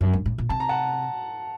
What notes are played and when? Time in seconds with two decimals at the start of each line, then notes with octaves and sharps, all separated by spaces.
0.01 F#2
0.13 G2
0.26 A2
0.38 A#2
0.49 C3 A5
0.60 A#5
0.69 F#5 A5